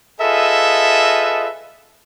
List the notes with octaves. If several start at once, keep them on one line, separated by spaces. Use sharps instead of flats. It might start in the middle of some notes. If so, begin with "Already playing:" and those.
F4 G#4 A4 B4 D#5 E5